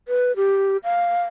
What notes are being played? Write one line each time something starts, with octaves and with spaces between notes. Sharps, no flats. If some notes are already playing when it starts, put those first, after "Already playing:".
B4
G4
F5